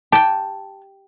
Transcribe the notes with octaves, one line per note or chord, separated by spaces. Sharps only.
G4 G5 A5